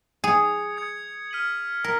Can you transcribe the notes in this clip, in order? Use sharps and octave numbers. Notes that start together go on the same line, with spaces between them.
G#4 D#6 G#6 C#7
D#6 G#6 C#7
F6 B6 D#7 F#7
A#4 B6